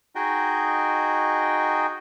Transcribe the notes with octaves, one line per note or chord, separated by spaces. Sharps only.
D#4 F#4 G#4 D#5 G5